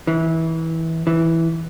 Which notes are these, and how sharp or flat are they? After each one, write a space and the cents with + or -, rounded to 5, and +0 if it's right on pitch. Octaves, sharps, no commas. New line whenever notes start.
E3 -20
E3 -5